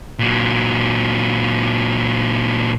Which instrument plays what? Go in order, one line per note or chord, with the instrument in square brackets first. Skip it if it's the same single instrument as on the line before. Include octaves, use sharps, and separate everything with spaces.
[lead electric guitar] A#2 F#3